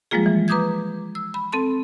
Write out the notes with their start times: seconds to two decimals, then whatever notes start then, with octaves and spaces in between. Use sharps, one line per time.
0.11 F3 G3 G#3 A#3 F4 G#4
0.26 E3
0.48 B4 A#5 D6 D#6 G6 G#6
1.15 E6
1.34 B5
1.52 C4 A4 A5 C6